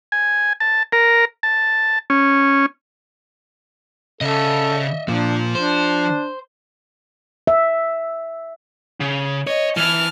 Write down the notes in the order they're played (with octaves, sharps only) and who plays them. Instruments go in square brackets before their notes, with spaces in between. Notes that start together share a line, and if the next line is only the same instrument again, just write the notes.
[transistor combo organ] G#5
A5
A#4
A5
C#4
[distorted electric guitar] C#3 [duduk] A4 [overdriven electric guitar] D#5 E5
[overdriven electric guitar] A#2 [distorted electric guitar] F3 F4 [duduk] D4
[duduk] D4 [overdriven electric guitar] C5
[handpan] E5
[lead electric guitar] C#3
[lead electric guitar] C#5 [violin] D#5
[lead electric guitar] E3 [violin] A5 F6